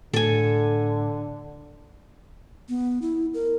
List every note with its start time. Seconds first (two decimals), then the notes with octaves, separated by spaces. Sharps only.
0.14 A2 D3 A4 G#5
2.69 B3
3.02 E4
3.34 A#4